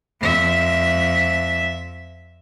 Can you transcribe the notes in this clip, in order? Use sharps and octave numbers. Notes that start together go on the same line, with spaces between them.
F2 E5